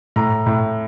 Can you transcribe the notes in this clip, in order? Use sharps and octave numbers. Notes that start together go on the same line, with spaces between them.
A2 A#5
A2